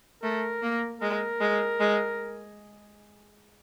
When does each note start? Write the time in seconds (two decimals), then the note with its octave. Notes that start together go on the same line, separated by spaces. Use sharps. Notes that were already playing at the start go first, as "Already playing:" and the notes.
0.22 A3 A#4
0.62 A#3
1.01 G#3 A#4
1.41 G#3
1.80 G#3